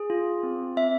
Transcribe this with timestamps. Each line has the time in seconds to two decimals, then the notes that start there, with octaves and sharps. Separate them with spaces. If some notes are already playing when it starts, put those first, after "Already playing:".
Already playing: G#4
0.10 F4
0.43 C4
0.76 C4 E5